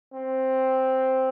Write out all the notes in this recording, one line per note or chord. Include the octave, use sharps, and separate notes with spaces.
C4